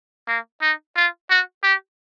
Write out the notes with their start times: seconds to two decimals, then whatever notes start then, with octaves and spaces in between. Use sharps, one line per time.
0.28 A#3
0.62 D#4
0.96 F4
1.30 F#4
1.63 G4